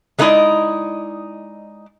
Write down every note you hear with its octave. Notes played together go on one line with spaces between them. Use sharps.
G#3 A3 D#4 E4 D5 D#5